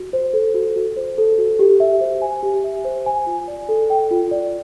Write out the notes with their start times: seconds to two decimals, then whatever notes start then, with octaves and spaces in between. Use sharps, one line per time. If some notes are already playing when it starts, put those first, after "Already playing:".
Already playing: F#4
0.13 C5
0.33 A4
0.55 F#4
0.76 F#4
0.96 C5
1.18 A4
1.38 F#4
1.59 G4
1.80 E5
2.01 C5
2.22 G#5
2.43 G4
2.64 E5
2.85 C5
3.06 G#5
3.27 F4
3.48 D5
3.69 A4
3.90 G5
4.11 F4
4.31 D5